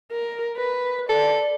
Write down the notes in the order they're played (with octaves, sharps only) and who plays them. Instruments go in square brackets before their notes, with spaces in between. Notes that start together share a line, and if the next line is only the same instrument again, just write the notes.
[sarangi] A#4
B4
[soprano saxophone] A4 [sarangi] D5